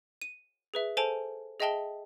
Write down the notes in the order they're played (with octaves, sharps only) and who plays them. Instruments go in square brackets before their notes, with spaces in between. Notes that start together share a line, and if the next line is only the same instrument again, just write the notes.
[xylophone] D#7
G#4 B4 E5
A4 C5 G#5 A5 D7 F7
G#4 D#5 E5 G5 A5 G7